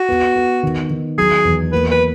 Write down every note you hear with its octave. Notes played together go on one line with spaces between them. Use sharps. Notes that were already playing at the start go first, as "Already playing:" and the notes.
Already playing: F#4
B3
B3
D#3
D#3
F#3 G#4
E2
A#3 B4
B4